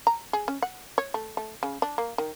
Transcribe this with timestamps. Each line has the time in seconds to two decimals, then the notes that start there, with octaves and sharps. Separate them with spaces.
0.07 A#5
0.33 G#4
0.48 C#4
0.62 F#5
0.98 C#5
1.14 A3
1.37 A3
1.63 C#3
1.82 D4
1.98 A#3
2.18 D#3